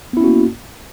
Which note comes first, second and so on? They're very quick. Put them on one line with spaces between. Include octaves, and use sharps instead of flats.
B3 E4 C#4 F#4 A#3